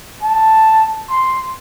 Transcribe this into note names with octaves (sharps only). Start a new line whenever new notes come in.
A5
C6